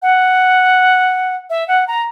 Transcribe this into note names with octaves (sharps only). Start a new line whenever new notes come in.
F#5
E5
F#5
A#5